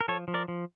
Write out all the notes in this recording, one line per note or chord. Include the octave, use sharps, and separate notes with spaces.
A#4
F3 A4 C#5
F3
A#4 D5
F3